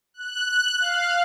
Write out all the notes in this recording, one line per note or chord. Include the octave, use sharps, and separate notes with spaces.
F#6
F5